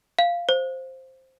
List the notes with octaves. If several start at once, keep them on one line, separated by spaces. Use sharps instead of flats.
F5
C5